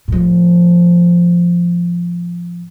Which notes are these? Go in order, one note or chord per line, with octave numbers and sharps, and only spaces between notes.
A2 F3